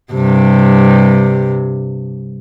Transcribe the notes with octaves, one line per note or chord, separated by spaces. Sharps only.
G2 C3